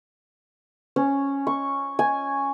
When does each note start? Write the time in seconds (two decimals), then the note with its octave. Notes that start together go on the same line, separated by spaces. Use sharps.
0.96 C#4
1.47 C#6
1.99 G#5